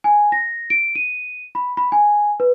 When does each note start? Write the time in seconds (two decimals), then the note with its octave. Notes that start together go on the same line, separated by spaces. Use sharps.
0.04 G#5
0.32 A#6
0.70 D7
0.95 D#7
1.55 B5
1.77 B5
1.92 G#5
2.40 B4